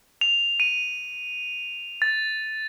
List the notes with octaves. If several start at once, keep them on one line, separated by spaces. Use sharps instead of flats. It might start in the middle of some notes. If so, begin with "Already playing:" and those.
F7
D#7
A6